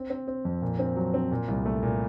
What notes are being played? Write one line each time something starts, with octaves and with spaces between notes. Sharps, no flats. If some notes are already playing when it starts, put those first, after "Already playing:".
Already playing: C4
C4
C4
F2
A#2
C4
F#3
C4
A#2
C2
A3
A#2